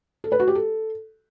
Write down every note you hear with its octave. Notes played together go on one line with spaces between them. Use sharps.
A4
B4
F#4
G4
A4